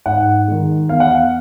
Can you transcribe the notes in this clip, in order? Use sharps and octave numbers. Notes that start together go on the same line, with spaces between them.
G#2 F#5
D#3 G#3
E2 F5
F#5
F5